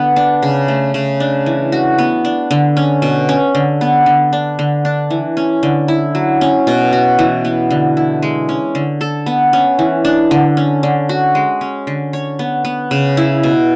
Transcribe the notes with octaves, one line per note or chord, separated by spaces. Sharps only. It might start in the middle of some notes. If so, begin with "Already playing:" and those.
Already playing: D3 B3 B4
D4
C#3
A3
C#3
D4
E3
F#4
B3
D4
D3
C#4
B2
C#4
D3
B3
D3
D4
D3
D4
E3
C#4
D3
E4
F#3
C#4
B2
F#4
E3
B3
D3
E4
G#3
C#4
D3
A4
B3
C#4
E3
D4
D3
C#4
D3
F#4
G#3
C#4
D3
C#5
B3
B3
C#3
E4
B2